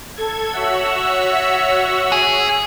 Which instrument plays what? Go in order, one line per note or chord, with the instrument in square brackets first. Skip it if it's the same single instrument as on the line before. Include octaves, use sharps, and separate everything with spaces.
[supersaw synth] A4 G#6
[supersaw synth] F#4 E5 F#5 [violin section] C#5 E6
[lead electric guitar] G#4